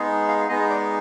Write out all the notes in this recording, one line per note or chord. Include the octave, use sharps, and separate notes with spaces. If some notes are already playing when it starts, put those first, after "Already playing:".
Already playing: G#3 B3 D#4 G#4
F5
G#3 B3 D#4 G#4 D#5
D5